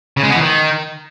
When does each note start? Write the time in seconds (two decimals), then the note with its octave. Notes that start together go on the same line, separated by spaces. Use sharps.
0.17 C#3
0.23 G#3
0.29 B3
0.35 E3
0.42 D#3